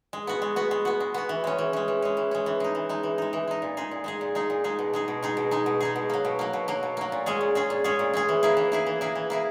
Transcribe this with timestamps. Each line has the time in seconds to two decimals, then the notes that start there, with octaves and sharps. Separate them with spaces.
0.13 G#3
0.27 B3 F#4
0.42 G#3
0.56 B3 F#4
0.71 G#3
0.85 B3 F#4
1.00 G#3
1.14 B3 F#4
1.29 E3
1.44 G#3 C#4
1.58 E3
1.73 G#3 C#4
1.88 E3
2.02 G#3 C#4
2.17 E3
2.31 G#3 C#4
2.46 E3
2.60 G#3 D#4
2.75 E3
2.89 G#3 D#4
3.03 E3
3.18 G#3 D#4
3.33 E3
3.48 G#3 D#4
3.62 A#2
3.77 G#3 D#4 G#4
3.91 A#2
4.04 G#3 D#4 G#4
4.21 A#2
4.35 G#3 D#4 G#4
4.50 A#2
4.64 G#3 D#4 G#4
4.79 B2
4.94 G#3 D#4 G#4
5.08 B2
5.23 G#3 D#4 G#4
5.37 B2
5.51 G#3 D#4 G#4
5.66 B2
5.81 G#3 D#4 G#4
5.96 B2
6.10 F#3 A#3
6.25 B2
6.39 F#3 A#3
6.53 B2
6.68 F#3 A#3
6.83 B2
6.97 F#3 A#3
7.12 A#2
7.26 G#3 C#4 G#4
7.41 A#2
7.55 G#3 C#4 G#4
7.70 A#2
7.84 G#3 C#4 G#4
7.99 A#2
8.14 G#3 C#4 G#4
8.29 E3
8.43 A#3 E4 G#4
8.57 E3
8.72 A#3 E4 G#4
8.86 E3
9.01 A#3 E4 G#4
9.15 E3
9.30 A#3 E4 G#4